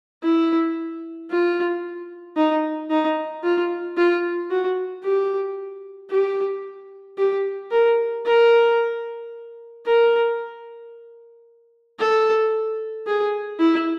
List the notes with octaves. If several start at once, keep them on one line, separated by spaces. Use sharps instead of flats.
E4
F4
D#4
D#4
F4
F4
F#4
G4
G4
G4
A#4
A#4
A#4
A4
G#4
E4